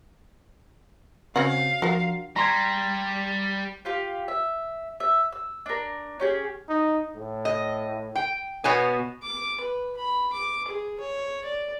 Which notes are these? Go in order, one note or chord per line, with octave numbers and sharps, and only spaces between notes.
C#3 C4 C#4 F#4 F5 F#5
F3 D4 F#4 A#4
G3 A#5 C6 G#6
F4 G4 F5
E5
E5
E6
D4 A#4
C#4 G4 G#4
D#4
A2
D#5
G5
B2 B3 C#5 G#5
D6
B4
B5
D6
G#4
C#5
D5